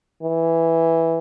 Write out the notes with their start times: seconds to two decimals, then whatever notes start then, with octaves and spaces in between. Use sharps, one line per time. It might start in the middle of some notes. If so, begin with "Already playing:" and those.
0.23 E3